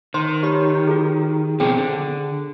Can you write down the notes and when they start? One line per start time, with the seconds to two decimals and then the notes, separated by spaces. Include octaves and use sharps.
0.14 D#3 C5 C6
0.43 G4 C#5 B5
0.87 F4 F#4 G#4
1.60 B2 F3 C4 G#4 G5
1.77 D3